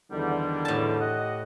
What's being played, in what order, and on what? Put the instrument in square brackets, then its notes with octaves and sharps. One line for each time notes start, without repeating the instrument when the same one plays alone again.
[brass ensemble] E2 D3 [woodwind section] D#3 G3
[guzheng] A2 A5
[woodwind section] G4 D#5 F#5